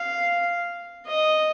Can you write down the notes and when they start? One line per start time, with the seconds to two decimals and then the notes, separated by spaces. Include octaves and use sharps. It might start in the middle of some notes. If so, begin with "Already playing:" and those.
Already playing: F5
1.06 D#5